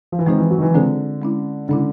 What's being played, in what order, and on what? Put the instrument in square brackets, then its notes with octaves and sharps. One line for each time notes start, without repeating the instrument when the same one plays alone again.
[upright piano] F3
E3
[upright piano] D#3 [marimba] G#3 C4 F4 G#4 C5
[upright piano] E3
F#3
D#3
E3
[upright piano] D3 [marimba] G#3 C4 F4 G#4 C5
[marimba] G#3 C#4 E4
[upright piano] D3 [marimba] G#3 C#4 E4